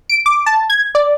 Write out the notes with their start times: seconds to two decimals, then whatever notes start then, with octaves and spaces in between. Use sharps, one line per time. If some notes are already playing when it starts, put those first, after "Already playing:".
0.09 D7
0.26 D6
0.46 A5
0.70 G#6
0.95 D5